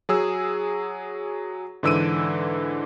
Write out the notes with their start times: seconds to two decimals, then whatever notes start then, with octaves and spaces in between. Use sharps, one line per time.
0.09 F#3 G#4 E6
1.83 G#2 D3 E3 E6 D7 D#7